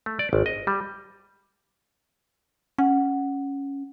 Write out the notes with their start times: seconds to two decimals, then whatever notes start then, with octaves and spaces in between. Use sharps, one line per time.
0.06 A3
0.19 D5
0.33 G#1
0.46 D#5
0.67 G3
2.78 C#4 F#5